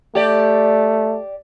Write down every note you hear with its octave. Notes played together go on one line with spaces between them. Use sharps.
A3 G4 D5